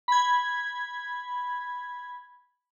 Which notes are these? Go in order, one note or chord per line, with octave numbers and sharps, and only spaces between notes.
B5 G#6